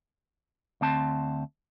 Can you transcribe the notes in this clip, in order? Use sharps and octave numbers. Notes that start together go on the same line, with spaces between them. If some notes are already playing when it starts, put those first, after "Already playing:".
D2 C4 A5